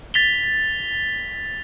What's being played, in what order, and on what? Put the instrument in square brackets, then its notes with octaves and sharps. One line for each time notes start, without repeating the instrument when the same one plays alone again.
[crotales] A6 B6 F7 G7